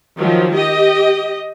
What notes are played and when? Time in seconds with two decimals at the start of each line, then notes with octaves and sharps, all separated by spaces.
0.16 D#3 F3 F#3
0.53 G4 D#5